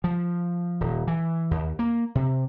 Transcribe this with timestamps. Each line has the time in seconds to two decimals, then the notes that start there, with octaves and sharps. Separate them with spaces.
0.04 F3
0.81 D#1
1.07 E3
1.51 D#2
1.79 A#3
2.15 C3